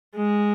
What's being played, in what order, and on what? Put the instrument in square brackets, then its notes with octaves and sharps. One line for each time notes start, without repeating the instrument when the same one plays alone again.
[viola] G#3